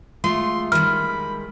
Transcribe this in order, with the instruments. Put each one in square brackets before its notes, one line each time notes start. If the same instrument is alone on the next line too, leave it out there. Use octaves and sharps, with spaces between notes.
[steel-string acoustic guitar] G#3 A3 F4 [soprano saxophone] C6
[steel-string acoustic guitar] D#3 G3 G#3 [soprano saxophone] B5 [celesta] F6